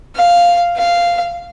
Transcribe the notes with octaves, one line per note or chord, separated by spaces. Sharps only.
F5
F5